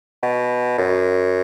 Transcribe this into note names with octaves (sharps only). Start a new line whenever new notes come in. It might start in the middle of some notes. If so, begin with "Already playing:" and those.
B2
F#2